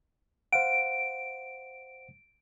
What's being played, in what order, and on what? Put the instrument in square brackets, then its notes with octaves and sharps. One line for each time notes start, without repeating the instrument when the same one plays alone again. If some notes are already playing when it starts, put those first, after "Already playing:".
[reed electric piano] C5 F5 F#5 [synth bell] D7